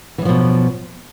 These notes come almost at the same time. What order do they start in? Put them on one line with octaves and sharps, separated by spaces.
E3 F#2 F3 B2